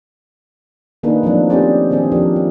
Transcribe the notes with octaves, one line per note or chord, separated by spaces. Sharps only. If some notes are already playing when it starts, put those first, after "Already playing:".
D#3 A#3 D4 D#4 G#4 B4
F3 F#3 A3 C4 D4 D#4
C4 C#4 G4 G#4 C5 D5
D#3 C4 D4 G#4
F3 D4 G4 A#4
E4